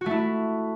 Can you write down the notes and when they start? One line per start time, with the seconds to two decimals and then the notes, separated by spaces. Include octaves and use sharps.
0.01 F#4
0.06 A3
0.11 E4